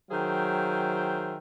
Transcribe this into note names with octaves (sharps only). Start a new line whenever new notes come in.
D#3 F#3 G#4 C5 E5 G5